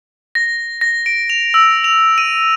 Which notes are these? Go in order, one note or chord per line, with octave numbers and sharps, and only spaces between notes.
A#6
A#6
D7
F7
E6
F7
D#7